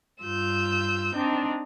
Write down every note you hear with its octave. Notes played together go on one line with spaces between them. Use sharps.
G2 F4 E6 G6
C4 D4 D#4